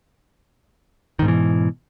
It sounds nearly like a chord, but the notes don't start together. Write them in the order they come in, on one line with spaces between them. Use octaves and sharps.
D#3 G#2 B2 E3